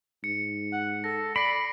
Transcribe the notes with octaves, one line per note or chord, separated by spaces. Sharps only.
G#2 C#7
F#5
A4 A#6
D5 B5 A#6 C7 D7